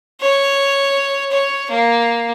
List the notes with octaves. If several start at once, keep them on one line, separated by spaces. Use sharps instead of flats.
C#5
C#5
A#3